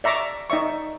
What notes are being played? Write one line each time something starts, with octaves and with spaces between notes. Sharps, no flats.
D5 E5 A#5 C#6 D6
D#4 D5 E5 C#6